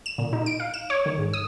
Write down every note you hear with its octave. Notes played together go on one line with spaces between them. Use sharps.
E7
A#2
D#4
D7
F5
E7
C#5
D#3
G#2
D#6